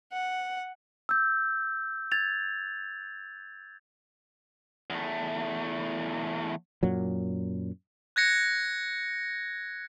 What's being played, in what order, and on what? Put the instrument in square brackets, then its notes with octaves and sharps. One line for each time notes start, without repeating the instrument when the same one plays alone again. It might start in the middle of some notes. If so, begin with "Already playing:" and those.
[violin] F#5
[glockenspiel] E6 G6
G#6 A6 F7
[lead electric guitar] E2 A3
[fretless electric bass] F#2 A#2 F#3
[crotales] F#6 G#6 A#6 C#7